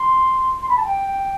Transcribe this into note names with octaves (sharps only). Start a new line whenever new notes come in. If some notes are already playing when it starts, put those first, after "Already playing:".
Already playing: C6
C6
B5
A5
G5